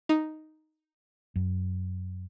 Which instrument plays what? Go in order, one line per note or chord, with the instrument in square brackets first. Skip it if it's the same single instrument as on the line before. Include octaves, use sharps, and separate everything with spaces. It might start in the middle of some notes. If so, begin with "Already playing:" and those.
[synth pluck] D#4
[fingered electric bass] F#2